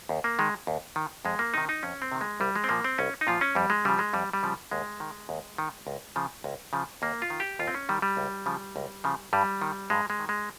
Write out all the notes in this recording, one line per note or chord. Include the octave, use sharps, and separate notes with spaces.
D#2
A#3
D#3 G#3
D#2
D#3
F2 G#3
A#3
C3 D#3 D#4
D#4
F2 C#4
C4
C3 D#3
G#3
C2 G3
G#3
C4
A#2 F3 A#3
C4
C2 C#4
D#4
A#2 F3 F4
C#4
F2 G3
G#3
C#3 F3 G3
G#3
F2 G3
G3
C#3 F3
D#2 G#3
D#3
D#2
D#3
C#2
C#3 F3
C#2
C#3 F3
D#2 A#3
F4
D#3
G4
D#2 F4
C4
C#4
D#3 G3
G3
C#2
C#3 F3
C#2
C#3 F3
G2 G3
D#3
G2 G#3
G#3
D#3
G#3